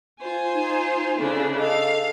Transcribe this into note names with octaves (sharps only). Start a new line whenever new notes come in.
F4 C5 G#5
D#4
C#3 D4 E4 A4
A4 D#5 F5